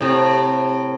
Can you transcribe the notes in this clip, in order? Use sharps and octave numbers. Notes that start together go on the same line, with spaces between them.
A2 C3